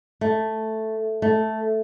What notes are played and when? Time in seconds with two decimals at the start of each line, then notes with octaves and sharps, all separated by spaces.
0.21 A3
1.22 A3